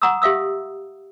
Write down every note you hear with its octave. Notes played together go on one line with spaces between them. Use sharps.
F#5 A#5 C#6 D#6 E6
G4 E5 F5 D#6 E6